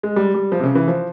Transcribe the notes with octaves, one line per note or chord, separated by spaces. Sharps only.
G#3
G3
G3
F3
C3
C#3
E3
F3